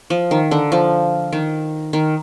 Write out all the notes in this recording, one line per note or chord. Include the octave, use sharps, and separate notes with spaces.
F3
D#3
D3
F3
D#3
D#3